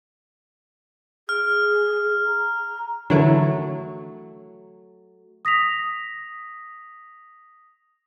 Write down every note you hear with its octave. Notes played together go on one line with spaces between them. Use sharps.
G#4 F6
A#5
D3 E3 F#3 A3 A#4
D#6 A#6 B6 F7